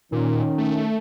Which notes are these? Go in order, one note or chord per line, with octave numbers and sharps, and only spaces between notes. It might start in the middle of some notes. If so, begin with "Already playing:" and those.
A#2 D#3 C#4
A3